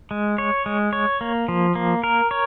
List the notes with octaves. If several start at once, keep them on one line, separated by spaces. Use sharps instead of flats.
G#3
C#5
G#3
C#5
A#3
F3
A#3
A#4
C#5